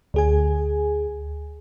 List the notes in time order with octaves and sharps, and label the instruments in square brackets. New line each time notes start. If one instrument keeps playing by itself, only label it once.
[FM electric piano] D2 G#4 G#5